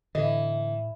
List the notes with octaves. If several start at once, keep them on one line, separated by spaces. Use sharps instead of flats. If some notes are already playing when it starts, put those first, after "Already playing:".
A2 D3 E3 D#5